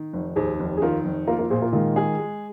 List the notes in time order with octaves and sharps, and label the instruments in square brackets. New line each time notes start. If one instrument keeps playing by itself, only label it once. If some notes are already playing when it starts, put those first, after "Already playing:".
Already playing: [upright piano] D#3
F1
[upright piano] D#2 [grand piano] G#4 C5
[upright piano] F1
[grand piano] G#4
[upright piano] D#3 [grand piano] F4 A#4
[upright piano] F1
[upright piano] A#3 [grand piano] F4 A#4
[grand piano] F4 A#4
[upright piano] A#2 [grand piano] G#4 C5
[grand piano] F4 A#4
[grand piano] D#3 G#3 [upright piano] F4
[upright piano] G#4
G#3